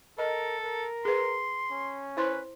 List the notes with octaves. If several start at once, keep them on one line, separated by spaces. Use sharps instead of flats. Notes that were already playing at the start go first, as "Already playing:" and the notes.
A4 A#4 D#5
A#4
G#4 B4 C6
C#4
E4 B4 C5 C6